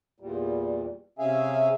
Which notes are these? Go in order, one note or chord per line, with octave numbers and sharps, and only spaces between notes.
E2 A#2 G3
C3 C#4 G#4 E5 F5 G#5